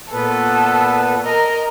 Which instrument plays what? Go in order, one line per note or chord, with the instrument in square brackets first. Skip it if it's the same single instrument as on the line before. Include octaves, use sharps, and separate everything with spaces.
[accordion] A#2 B3 B4 [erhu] A4
[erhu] A#4 [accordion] D#5